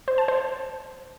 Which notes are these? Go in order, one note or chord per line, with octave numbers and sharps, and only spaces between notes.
C5
A5
C5